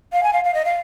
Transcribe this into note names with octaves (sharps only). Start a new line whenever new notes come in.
F5
G#5
F5
F5
D#5
F5